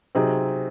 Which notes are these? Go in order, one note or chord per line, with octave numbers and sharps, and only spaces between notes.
C3 F#3 C4 D#4 G#4